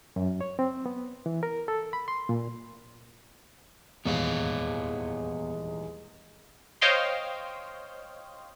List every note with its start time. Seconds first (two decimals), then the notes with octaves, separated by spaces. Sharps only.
0.16 F#2
0.41 C#5
0.59 C4
0.86 B3
1.26 E3
1.43 A#4
1.68 A4
1.93 B5
2.08 C6
2.29 A#2
4.05 D#1 E2 G#2 G#3 B3 C#5 F5
6.81 C5 C#5 D#5 F5 G5 C6